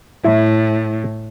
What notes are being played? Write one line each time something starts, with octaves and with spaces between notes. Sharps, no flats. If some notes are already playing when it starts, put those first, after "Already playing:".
A2 E4